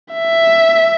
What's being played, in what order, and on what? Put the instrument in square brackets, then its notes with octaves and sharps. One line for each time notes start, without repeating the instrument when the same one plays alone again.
[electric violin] E5